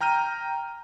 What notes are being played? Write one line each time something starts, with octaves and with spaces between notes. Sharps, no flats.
G5 A#5 F6 G6 D#7